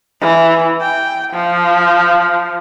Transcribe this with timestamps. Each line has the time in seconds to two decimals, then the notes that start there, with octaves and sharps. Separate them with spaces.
0.21 E3
0.81 G5
1.33 F3